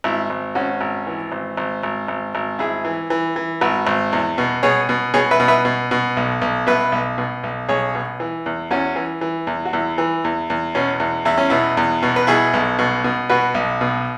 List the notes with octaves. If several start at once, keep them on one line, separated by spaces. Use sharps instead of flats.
G#1 E4
G#1
G#1 C#4 F#4
G#1
E3
G#1
G#1
G#1
G#1
G#1
G#1 E4 G#4
E3
E3
E3
G#1 F#4 B4
G#1
E2
B2
B2 G#4 C#5
B2
B2 G#4 C#5
B4 E5
B2
B4 E5
B2
B2
B1
B1
B2 B4 E5
B1
B2
B1
B1 G#4 C#5
B2
E3
E2
E2 C#4 F#4
E3
E3
E2
F#4
E2 E4
E3
E2
E2
B2 C#4
E2
E2 E4
C#4
B2 E4
E2
B2
B4
B2 E4 G#4
B1
B2
B2
B2 F#4 B4
B1
B2